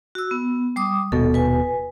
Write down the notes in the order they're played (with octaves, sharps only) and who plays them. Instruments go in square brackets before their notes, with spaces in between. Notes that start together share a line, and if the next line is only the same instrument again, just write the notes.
[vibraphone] F#4 E6
B3
G3 D6 D#6
[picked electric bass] D#1 B2 [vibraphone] A4
[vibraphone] B4 G#5